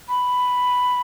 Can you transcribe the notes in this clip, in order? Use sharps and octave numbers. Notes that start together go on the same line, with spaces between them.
B5